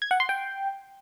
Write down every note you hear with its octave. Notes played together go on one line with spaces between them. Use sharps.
G#6
F#5
C6
G5